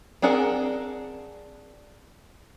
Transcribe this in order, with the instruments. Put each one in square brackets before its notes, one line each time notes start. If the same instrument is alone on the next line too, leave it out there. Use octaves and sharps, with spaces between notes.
[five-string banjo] C4 D4 G#4 A#4 F#5